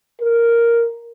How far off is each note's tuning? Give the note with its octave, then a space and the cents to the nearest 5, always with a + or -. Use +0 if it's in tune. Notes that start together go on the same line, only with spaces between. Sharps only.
A#4 +0